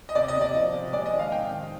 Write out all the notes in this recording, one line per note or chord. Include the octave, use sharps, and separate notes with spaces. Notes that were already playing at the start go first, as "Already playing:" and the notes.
D#5
C3 D5
D#5
C3
D5
F3
C3
G#3 D5
D#5
D#3
F5
C3 G5
D#3